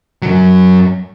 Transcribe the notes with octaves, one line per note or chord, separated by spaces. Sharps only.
F#2 F#3